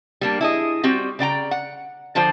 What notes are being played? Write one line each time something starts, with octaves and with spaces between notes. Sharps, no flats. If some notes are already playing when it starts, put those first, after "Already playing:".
G3 A#3 D4
E4 G#4 D#5
G3 C4 F#4 G4
C#3 D5 G5 A#5
F#5
D3 F3 F4 C5 D5